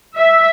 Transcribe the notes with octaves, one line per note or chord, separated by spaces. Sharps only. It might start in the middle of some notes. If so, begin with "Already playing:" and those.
E5